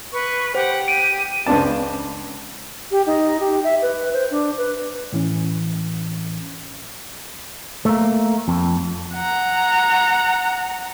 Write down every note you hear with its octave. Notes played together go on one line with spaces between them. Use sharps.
B4 C#6
G4 C5 F#5
D7 D#7
C#2 C#3 C4 D4 A5
G4
D#4
G4
E5
B4
C5
D4
B4
A2 E3 C#4
A3 A#3
F2
F#5 A#5